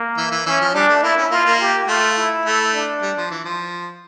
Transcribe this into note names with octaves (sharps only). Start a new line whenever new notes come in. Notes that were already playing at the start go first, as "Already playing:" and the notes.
Already playing: A#3
E3
E3
E3 C#4
F3
G3 D4
A3
A#3 D4 E4
C#4
A#3 F4
A#3
G4
A3 F4
E4
A3
D4
G3
F3
E3
F3